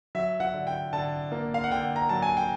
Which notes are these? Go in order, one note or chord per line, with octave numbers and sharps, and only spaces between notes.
F#3 E5
F#5
D3
G5
D3 A5
A#3
F5
F#5
D3 G5
A#5
F#3 A5
G#5
G5